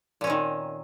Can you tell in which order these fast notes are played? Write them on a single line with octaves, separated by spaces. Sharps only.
A#2 C#4 C4 D#3